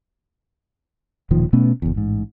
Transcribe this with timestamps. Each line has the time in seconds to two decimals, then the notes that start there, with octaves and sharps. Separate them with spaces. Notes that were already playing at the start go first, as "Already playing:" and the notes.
1.31 E1 A#2 D#3 F3
1.53 B2 A3 B3 C#4
1.82 F#1 E2
1.94 A1 G#2